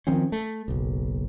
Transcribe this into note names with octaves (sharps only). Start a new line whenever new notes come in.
D#3 F3 C4 C#4
A3
F#1 B1